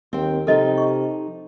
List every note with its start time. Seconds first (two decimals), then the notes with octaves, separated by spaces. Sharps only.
0.13 D#2 C4 G5
0.47 C3 F3 D#4 G4 A4 D#5
0.78 C#6